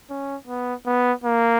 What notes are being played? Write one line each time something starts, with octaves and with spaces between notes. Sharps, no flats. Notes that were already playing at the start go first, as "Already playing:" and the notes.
C#4
B3
B3
A#3